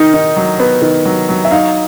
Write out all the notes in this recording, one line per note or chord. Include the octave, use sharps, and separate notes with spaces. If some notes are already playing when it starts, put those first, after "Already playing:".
Already playing: D#3 D#4
D#4
F#3
B3
D#3
F#3
F#3
E5
D#4 F5